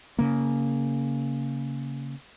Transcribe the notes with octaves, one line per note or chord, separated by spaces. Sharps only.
C#3 A#3